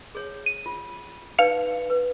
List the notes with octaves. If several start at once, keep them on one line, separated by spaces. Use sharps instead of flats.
G#4 C#5
D#7
F4
D#4 B4 D5 F5 C#7
B4